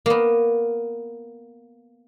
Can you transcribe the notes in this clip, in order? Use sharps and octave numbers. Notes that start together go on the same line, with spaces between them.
A#3 B3